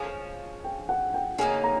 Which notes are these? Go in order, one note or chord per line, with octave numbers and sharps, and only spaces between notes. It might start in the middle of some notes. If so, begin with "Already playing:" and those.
Already playing: F3 G#3 C#4 G#5
G5
F#5
G5
C#3 F#3 A#3 D#4 G#5
A#5